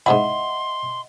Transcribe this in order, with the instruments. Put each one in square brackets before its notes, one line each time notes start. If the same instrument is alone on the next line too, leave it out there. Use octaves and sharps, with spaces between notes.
[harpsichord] G#2 C3 E4 [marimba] D#5 E5 [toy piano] F#5 [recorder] C6